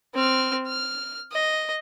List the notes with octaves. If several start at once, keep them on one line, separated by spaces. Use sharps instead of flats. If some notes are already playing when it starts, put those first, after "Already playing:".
C4 F6
F6
D#5